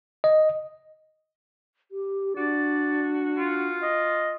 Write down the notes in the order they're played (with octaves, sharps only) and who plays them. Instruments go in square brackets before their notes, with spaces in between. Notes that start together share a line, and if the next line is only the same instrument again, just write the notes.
[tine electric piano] D#5
[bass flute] G4
[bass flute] D4 [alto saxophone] F#4 [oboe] D5
[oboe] F4
[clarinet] D#5